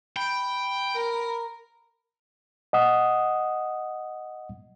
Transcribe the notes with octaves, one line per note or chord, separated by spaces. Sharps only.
G5 B5
A#4
D#5 F#5 D#6